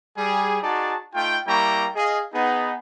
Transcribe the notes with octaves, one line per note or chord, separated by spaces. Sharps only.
G3 G#4
D#4 F#4 G#4 D5 A5
A3 D#4 F4 G5
G3 A#3 E4 G5 A#5 C#6
G#4 D#5 F5
B3 D#4 G#4